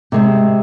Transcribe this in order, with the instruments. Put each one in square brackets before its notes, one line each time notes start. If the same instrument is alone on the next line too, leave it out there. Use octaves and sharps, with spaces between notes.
[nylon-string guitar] C3 G#3 C4